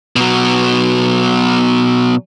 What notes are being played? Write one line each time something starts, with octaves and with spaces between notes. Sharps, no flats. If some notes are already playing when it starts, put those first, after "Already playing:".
B2 F#3